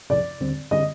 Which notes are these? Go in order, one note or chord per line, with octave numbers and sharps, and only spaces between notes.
C2 C3 F3 D5
D#2 D3 G3 C4
D3 G3 C4 D#5